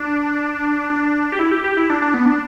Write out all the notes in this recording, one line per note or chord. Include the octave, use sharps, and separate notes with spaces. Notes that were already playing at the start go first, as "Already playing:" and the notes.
Already playing: D4
D4
G4
E4
G4
G4
E4
D4
D4
B3
D4